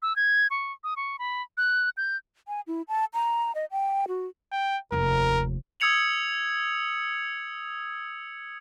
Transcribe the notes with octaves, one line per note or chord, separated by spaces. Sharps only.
E6
G#6
C#6
D#6
C#6
B5
F#6
G6
G#5
E4
A5
A#5
D#5
G5
F#4
G5
F1 D#2 A#4
D#6 E6 G#6 C#7 F7 F#7